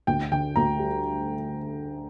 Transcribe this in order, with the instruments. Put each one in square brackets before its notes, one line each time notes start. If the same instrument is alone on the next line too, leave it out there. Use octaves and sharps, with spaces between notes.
[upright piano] D2 [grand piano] G5
[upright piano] D3 [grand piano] G5
[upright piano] D2 [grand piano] A#5
[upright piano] G3